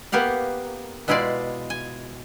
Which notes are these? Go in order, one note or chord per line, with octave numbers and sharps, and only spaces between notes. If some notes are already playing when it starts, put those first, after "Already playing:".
A#3 B3 G4 F5 F#5
B2 G#3 E4 F4 G#4 D5
G#5